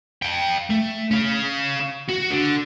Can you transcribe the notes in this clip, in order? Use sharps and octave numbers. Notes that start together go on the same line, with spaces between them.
F5 G5
A3
C#4 F5
F#4
D3